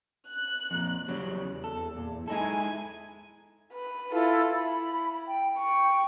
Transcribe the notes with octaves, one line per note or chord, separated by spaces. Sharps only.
F#6
F2 A#2
E2 C#3 F#3 G3
A4
A#2
G#3 D#4 E4 A4 G#5
B4
E4 F4 A4
E4 B5
G5
G5 C#6